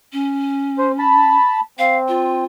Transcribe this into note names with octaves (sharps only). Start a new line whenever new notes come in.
C#4
C5
A5 B5
C4 F5
F4